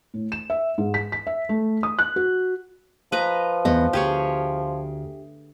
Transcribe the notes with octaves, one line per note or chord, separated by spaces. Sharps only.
A2
E7
E5
G#2
B6
B6
E5
A3
D#6
F#6
F#4
F3 B4 D#5 A#5
E2 B3 D#5
D2 G4 G#4 C#5